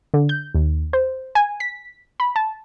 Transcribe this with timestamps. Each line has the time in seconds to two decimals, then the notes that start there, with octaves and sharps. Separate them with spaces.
0.14 D3
0.29 G6
0.55 D#2
0.93 C5
1.35 G#5
1.60 B6
2.20 B5
2.36 A5